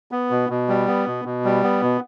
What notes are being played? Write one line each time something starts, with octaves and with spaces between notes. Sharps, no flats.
B3
B2
B2
G3
B3
B2
B2
G3
B3
B2